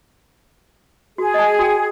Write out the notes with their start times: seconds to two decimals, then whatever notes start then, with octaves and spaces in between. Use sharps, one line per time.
1.18 F#4 G#4
1.34 D#5 A5
1.59 F#4 G5